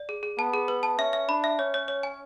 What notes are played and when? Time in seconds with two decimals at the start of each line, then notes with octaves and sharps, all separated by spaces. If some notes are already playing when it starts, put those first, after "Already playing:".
Already playing: D5
0.09 G#4
0.23 G#4
0.38 B3 A5
0.54 G#4
0.68 B4
0.83 A5
0.98 C#4 E5
1.13 E5
1.29 D4 B5
1.44 E5
1.59 C#4 C#5
1.74 C#5
1.88 C#5
2.03 G#5